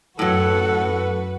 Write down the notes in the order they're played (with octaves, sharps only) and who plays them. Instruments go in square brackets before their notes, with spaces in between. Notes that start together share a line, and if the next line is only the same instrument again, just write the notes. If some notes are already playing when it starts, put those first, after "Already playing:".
[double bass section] F#2 [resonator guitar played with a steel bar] A2 F#3 [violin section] F#4 B4 [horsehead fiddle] A4 F#5